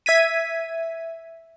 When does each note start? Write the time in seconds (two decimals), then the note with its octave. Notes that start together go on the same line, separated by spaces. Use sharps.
0.06 E5 G#6 B6 D#7